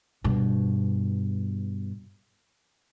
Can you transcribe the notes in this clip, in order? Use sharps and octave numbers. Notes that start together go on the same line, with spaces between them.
G2 B2